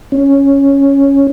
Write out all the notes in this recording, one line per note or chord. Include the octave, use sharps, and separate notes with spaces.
C#4